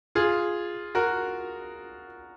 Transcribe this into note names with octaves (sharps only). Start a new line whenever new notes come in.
F4 G#4
F#4 A#4